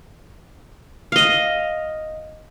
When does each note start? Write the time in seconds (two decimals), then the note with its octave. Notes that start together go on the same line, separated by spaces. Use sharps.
1.12 D#5 F5